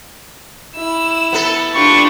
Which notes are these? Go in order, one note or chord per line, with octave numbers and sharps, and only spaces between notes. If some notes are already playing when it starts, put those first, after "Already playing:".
E4 E6
B3 A4
D4 F4 G4 C#6